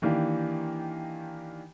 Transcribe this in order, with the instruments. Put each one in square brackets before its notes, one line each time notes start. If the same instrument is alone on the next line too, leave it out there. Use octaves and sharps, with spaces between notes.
[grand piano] D#3 E3 A#3 D4 G4